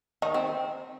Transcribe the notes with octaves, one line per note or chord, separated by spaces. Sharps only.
D#3 D#4
C4